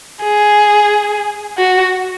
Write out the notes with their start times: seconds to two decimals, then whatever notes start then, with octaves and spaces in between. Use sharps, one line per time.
0.23 G#4
1.58 F#4